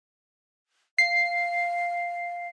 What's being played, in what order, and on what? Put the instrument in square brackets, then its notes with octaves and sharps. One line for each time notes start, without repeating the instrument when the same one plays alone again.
[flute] F5 [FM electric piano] C7